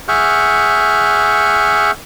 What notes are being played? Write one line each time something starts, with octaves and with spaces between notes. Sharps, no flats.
G#4 E5 F#5 C#6 F6 G6